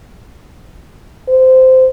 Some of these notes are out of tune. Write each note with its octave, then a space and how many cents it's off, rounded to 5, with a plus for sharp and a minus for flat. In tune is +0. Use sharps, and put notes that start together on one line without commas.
C5 -15